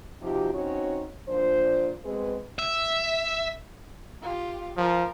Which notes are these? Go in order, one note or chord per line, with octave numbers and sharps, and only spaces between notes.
C3 F3 D#4 F#4 G4
C4 C#4 D#4 F#4 C#5
A#2 F3 D4 C5
B2 G#3 C4 G#4 B4
E5
F4 G4
F3 A#4